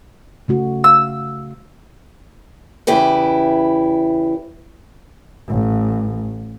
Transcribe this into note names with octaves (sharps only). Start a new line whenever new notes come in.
C#3 A3 F#4
F5 E6
E2 C#3 E4 G4 B4
A1